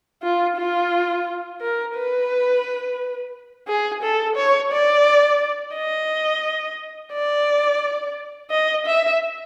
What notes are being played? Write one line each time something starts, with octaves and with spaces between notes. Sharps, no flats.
F4
F4
A#4
B4
G#4
A4
C#5
D5
D#5
D5
D#5
E5